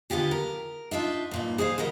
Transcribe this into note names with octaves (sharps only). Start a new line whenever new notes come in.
D3 B3 F4 G4 G#4
A#4
D4 D#4 F4 E5
G2 A#2 D#4
G#4 C5 D5 F5
C#3 F#3 D#4 A#4 B4